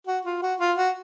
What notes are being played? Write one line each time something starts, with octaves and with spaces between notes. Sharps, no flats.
F#4
F4
F#4
F4
F#4